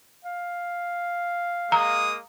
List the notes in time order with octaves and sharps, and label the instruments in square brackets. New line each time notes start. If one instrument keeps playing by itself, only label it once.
[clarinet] F5
[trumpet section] G#3 A#3 D#6 [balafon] A#5